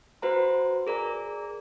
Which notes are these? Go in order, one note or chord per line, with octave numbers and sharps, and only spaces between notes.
F#4 B4 C5 A#5
G#4 A#4 D5 A#5